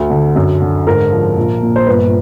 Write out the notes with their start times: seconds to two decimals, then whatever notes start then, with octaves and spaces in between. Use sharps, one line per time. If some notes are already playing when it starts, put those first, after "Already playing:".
Already playing: D2
0.10 D3
0.36 F#2
0.62 D3
0.87 G#2 A#4
1.11 F3
1.36 A#1
1.62 A#2
1.76 C5
1.87 G1 B4